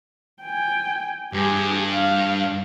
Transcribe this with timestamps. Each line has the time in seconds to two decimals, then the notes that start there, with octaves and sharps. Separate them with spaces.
0.42 G5 G#5
1.33 G2 G4 G#4
1.93 F5